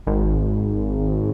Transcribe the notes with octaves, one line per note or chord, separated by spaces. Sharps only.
G#1